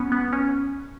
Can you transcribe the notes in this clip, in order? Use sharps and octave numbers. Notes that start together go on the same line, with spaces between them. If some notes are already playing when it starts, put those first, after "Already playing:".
Already playing: B3 C#4
B3
C#4